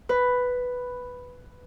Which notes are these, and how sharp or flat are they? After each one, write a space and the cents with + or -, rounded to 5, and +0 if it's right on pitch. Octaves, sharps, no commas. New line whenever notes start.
B4 +5